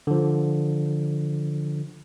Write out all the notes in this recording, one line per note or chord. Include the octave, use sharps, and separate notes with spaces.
D3 F3